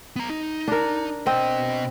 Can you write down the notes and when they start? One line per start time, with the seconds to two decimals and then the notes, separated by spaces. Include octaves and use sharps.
0.16 B3 A#5
0.30 D#4
0.68 D4 A#4
1.27 B2 C4 D#5